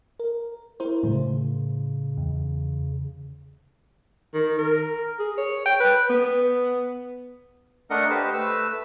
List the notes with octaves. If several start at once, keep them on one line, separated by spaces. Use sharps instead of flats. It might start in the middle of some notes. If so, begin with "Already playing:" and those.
A#4
E4 A#4 C5
A2 C#3
E2
D#3
A#4
G#4
C#5
G5
B4
B3
A3 D4 A#4 D#5 F#5
G4 B4 C5 D#5
A3 B4 E6